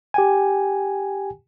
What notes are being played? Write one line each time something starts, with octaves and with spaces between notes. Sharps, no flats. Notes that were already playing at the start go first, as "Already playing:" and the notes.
G4 G5 G#5